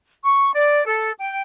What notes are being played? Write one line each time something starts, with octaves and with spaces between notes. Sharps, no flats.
C#6
D5
A4
G5